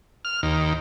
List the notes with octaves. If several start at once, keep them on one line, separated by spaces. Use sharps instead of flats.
F6
D#2